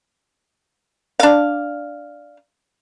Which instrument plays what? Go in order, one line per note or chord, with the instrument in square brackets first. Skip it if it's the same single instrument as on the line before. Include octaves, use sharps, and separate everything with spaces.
[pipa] D4 F5